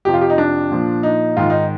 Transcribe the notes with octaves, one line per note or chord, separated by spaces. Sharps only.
F2 C3 F3 G4
F4
G4
D#4
D4
A#2 F3
D#4
G#2 D#3 F4
D#4